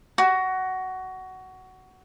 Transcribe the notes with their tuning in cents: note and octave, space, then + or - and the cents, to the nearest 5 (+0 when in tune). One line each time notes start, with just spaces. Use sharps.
F#4 +15